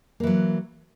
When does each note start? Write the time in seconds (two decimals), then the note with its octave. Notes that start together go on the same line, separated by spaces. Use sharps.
0.20 A#3
0.23 E3
0.27 F#3